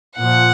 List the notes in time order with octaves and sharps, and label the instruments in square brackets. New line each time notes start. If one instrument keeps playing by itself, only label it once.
[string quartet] A#2 F3 F#5